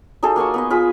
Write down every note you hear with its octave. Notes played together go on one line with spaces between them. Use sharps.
D#4 F#4 G#4 A4
A#3 G#5 C#6 D#6
B3 F#4 D#5
F4 G#4 B5